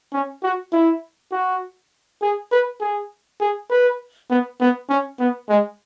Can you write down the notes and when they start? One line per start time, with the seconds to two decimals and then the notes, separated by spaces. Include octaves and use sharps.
0.13 C#4
0.43 F#4
0.72 E4
1.32 F#4
2.22 G#4
2.52 B4
2.80 G#4
3.41 G#4
3.70 B4
4.30 B3
4.60 B3
4.89 C#4
5.19 B3
5.49 G#3